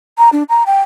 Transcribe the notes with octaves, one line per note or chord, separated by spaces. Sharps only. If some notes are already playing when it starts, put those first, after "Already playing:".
A#5
D4
A#5
G5